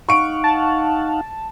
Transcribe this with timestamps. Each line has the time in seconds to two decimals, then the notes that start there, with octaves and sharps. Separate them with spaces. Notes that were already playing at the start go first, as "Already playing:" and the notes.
0.09 D#4 F5 F#5 C#6 D7
0.44 A5